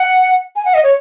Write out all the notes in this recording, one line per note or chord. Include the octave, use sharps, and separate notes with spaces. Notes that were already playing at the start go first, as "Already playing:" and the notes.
Already playing: F#5
G#5
F#5
D#5
C#5